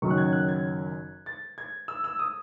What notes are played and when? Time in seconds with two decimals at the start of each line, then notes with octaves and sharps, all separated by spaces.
0.02 F#1 F#2 D#3 F#3 C#6
0.10 F#6
0.18 G#6
0.33 F#6
0.48 G#6
1.26 A6
1.58 G#6
1.88 E6
2.04 E6
2.19 D#6